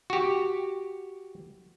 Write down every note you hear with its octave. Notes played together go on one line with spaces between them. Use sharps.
F#4 G4